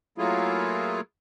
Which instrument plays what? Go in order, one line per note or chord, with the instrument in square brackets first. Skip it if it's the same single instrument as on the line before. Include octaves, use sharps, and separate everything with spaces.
[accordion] F#3 A3 A#3 E4 F4 G#4